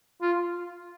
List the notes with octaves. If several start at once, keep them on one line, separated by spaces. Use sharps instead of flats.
F4